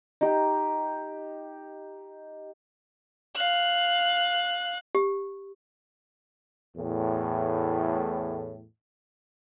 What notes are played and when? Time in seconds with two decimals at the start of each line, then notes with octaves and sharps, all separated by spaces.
0.21 D#4 G4
3.36 F5 F#6
4.95 G4
6.77 E2 A2